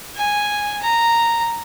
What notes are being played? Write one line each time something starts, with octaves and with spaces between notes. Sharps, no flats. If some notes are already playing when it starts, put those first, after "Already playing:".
G#5
A#5